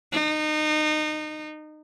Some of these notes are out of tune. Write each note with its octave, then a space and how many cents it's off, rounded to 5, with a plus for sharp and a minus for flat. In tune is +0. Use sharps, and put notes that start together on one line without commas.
D#4 -25